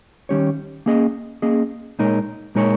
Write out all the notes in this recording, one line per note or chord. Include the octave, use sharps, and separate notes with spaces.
D#3 G3 C#4 G4 C#5
A#3 C#4 G#4 D#5
A#3 C#4 G#4 D#5
A#2 G#3 D#4 A#4 C#5
A#2 G#3 D#4 A#4 C#5